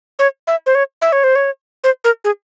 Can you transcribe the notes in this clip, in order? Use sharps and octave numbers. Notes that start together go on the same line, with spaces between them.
C#5
E5
C5
C#5
E5
C#5
C5
C#5
C5
A#4
G#4